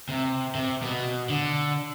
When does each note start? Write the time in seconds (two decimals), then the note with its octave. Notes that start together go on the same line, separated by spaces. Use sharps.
0.09 C3
0.55 C3
0.82 B2
1.29 D3